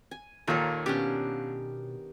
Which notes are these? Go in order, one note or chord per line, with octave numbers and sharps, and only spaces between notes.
G#5
D#2 A#2 D#3 A4 C#5
B2 B3 C#4 D4 G4